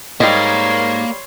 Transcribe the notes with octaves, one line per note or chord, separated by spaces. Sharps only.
G#2 G3 A#3 C#5 D#5 C6